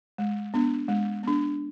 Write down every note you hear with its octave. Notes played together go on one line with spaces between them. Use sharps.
G#3
B3 D4
G#3
B3 D4